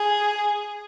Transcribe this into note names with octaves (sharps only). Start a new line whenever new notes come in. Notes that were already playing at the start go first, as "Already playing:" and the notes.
Already playing: G#4